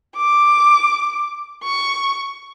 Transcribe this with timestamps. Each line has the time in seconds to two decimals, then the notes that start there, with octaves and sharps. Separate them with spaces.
0.17 D6
1.64 C#6